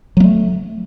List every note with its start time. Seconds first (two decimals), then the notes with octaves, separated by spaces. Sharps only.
0.17 F#3
0.20 A#3
0.24 A3